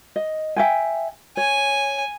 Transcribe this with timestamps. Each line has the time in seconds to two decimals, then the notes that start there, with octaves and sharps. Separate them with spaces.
0.16 D#5
0.56 E5 G5 G#5
1.37 C#5 G#5